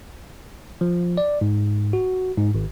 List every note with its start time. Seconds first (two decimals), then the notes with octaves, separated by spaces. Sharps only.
0.81 F3
1.17 D5
1.41 G#2
1.93 F#4
2.37 G#2
2.55 G#1